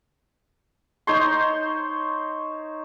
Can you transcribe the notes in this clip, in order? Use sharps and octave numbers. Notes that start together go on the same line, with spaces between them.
D#4 C5 C#5 C6